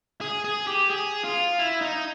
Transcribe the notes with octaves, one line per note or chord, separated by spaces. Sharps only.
G#4
G#4
G4
G#4
F4
E4
D#4